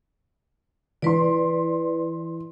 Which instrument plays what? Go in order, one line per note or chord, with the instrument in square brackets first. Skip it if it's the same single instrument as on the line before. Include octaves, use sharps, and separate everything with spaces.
[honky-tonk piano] E3 C6 [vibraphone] B4 D5